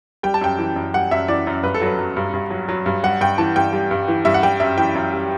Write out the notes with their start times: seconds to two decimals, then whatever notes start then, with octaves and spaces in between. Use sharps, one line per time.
0.23 G3 G5
0.34 A5
0.41 F#2 G5
0.58 E3
0.76 F#2
0.94 G3 F#5
1.11 F#2 E5
1.28 E3 D5
1.47 F#2
1.63 G2 B4
1.74 A4
1.82 F#3 B4
1.99 F#3
2.17 G2
2.33 G2
2.51 F#3
2.69 F#3
2.86 G2
3.03 G3 F#5
3.21 G2 G5
3.38 E3 A5
3.56 G2 G5
3.73 G3
3.91 G2
4.08 E3
4.25 G2 E5
4.34 F#5
4.43 G3 G5
4.60 F#2 E5
4.78 E3 G5
4.95 F#2
5.13 G3